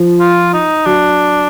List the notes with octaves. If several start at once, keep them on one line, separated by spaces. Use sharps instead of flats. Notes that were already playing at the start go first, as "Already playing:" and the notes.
Already playing: F3
F4
D#4
F#3 D4